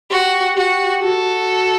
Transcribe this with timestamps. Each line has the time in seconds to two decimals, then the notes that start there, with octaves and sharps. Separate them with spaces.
0.11 F#4 G4
0.57 F#4 G4
1.03 F#4 A4